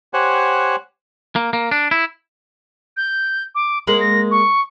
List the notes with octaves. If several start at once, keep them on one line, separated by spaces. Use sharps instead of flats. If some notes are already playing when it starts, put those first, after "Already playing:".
G4 C5 C#5 F#5 G#5 F#6
A#3
A#3
D4
E4
G6
D6
G#3 A#3 F#7
A#6
C#6